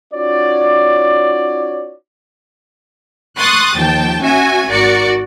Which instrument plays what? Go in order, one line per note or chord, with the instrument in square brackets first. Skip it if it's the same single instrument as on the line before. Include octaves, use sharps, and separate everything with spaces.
[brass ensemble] C#4 D#4 F4 F#4 C#5 D5
[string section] C6 C#6 D#6 F#6 A6
D#2 F3 G5 A5
C#4 F#4 E5 G#5
G#1 F#4 A#4 D5 C#7